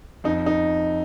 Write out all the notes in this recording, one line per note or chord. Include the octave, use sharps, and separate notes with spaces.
F2 D#4
D#4